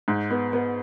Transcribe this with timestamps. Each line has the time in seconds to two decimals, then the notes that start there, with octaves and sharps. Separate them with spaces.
0.08 G#2
0.30 B3
0.53 B3